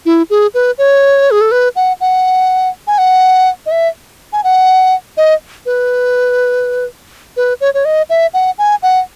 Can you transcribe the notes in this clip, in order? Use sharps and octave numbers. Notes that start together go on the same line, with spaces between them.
E4
G#4
B4
C#5
G#4
A4
B4
F#5
F#5
G#5
F#5
D#5
E5
G#5
F#5
D#5
B4
B4
C#5
C#5
D#5
E5
F#5
G#5
F#5